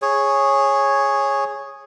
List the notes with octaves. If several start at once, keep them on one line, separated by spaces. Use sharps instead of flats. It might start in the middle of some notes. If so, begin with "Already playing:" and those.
G#4 C#5